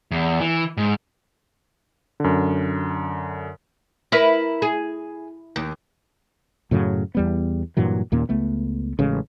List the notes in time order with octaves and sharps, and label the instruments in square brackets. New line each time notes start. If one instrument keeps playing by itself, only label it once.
[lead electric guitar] E2
E3
G#2
[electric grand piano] F#2 D3
[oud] E4 A#4 B4
G#4
D#2
[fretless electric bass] F#2 A2 C#3 F#3
E2 G3 B3
G2 A#2 E3 F#3
D#2 A#2 A#3 C#4
C#2 A3 B3
A1 C#3 G#3